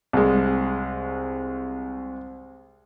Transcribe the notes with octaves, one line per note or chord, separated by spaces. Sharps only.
C2 G#3